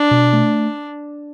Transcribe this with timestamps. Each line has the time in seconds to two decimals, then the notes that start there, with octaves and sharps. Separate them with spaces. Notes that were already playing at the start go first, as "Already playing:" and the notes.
Already playing: D4
0.11 B2
0.33 A3